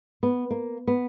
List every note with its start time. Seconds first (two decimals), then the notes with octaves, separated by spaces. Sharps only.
0.23 B3
0.51 A#3
0.87 B3